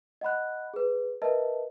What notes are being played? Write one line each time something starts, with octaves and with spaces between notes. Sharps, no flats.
D#5 F#5 B5 F#6
G#4 B4
A#4 B4 D#5 E5 A5